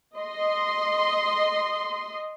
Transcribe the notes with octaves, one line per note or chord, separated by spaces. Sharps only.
D#5 C6